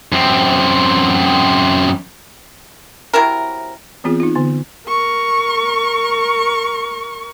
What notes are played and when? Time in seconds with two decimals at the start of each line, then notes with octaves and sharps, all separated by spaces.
0.12 F#2 C4
3.14 C3 F#3 E4 A#4
4.04 E3 B3 C4 F4 G#4
4.20 D#4 F4
4.35 D3 B3
4.88 A#4 C#6